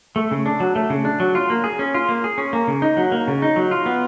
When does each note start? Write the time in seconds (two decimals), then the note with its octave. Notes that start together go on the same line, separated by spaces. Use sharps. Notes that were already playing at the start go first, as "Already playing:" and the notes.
0.16 A3
0.31 C#3
0.46 D4
0.60 F#3
0.76 A3
0.90 C#3
1.05 D4
1.20 F#3
1.35 F4
1.50 A#3
1.64 G#4
1.79 C#4
1.94 F4
2.09 A#3
2.24 G#4
2.38 C#4
2.53 A#3
2.68 C#3
2.82 D#4
2.97 F#3
3.12 A#3
3.28 C#3
3.42 D#4
3.56 F#3
3.71 F4
3.86 B3